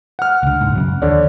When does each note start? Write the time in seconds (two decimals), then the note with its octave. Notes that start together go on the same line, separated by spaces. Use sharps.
0.19 F#5 F6
0.43 C#2 D3
0.61 D#1 C#2 G#2
0.75 F#2 C#3 F#3
1.02 D#2 D3 C#5 D5